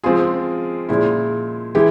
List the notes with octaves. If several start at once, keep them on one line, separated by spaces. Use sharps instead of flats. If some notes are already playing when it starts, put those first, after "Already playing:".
F3 G#3 C4 F4 G#4
A#2 F3 G#3 E4
E3 G#3 E4 G4